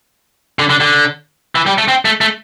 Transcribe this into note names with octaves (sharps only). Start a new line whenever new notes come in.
D3
D3
D3
E3
G3
A3
C4
A3
A3